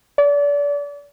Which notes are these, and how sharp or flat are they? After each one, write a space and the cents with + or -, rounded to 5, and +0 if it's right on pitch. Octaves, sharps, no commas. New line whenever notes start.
D5 -30